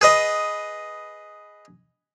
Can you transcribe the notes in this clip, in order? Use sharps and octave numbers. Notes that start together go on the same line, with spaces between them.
G#4 B4 D#5